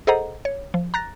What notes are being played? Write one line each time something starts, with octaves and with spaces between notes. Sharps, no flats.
G#4 A4 C5 D#5 F#5 A#5
C#5
F3
A#5 F#6 A6 A#6